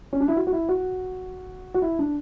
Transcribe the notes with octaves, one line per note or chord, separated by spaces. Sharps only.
C#4
D4
E4
F#4
F#4
E4
F#4
F#4
E4
D4